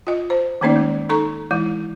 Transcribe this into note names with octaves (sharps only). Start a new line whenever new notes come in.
F4 D#5
C5
D#3 A3 A#3 C#4 D#4 D5
G#3
D#4 A4 A#5 C#6
E3 G#3 E4